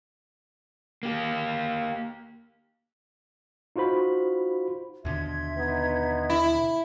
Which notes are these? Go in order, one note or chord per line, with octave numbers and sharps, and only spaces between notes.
A#3 G4
D#4 F4 F#4 C5 B5
D#2 B2 D3 E5 C6 G#6
B3 D#4
E4